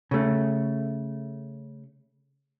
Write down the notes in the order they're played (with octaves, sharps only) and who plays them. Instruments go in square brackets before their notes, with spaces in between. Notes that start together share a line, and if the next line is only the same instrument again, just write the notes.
[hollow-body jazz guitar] C#3 A3